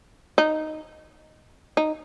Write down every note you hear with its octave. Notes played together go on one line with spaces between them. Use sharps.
D#4
D#4